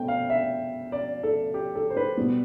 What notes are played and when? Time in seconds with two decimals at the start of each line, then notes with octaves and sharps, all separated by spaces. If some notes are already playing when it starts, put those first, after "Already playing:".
Already playing: B2 A3 C4 G5
0.08 F5
0.30 E5
0.92 D5
1.23 A4
1.54 G4
1.75 A4
1.90 C5
1.97 B4
2.17 B2 G3 B3